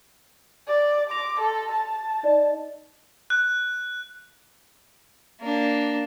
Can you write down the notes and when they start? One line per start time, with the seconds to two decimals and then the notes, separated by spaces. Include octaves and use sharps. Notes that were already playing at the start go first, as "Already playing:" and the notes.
0.68 D5
1.10 C6 D6 A#6 F7
1.40 A4
1.72 A5
2.23 D#4 D5 D#5
3.30 F#6
5.41 A#3 D4